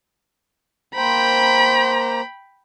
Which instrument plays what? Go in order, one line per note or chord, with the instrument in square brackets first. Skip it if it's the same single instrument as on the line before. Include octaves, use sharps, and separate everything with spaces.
[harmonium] A#3 C5 A#5 [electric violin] G5 B5